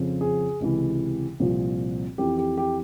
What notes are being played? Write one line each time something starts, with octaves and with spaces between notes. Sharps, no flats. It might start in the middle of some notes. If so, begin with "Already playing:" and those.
Already playing: F2 C#3 F3
G#4
C#2 C3 E3
C2 A#2 F3
F2 E3 G4
G4
G4